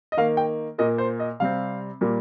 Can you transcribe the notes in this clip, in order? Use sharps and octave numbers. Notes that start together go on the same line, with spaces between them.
D#5
D#3 A#3 F5
G5
A#2 A#3 D#5
C5
D#5
C3 G3 C4 F5
A#2 G3 A#3